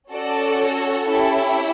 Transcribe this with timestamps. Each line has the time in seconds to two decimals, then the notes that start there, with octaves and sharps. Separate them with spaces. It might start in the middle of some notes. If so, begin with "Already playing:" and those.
0.12 C#4 F#4 A4 D5
0.60 C#5
1.07 C#4 E4 G4 A4